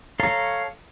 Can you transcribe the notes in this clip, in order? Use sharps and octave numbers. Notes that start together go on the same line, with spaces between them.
A4 C#5 F5 A#5